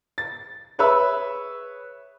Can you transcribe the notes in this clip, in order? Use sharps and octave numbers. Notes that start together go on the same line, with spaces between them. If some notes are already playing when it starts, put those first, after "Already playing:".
A6
G#4 B4 C#5 E5 B5 E6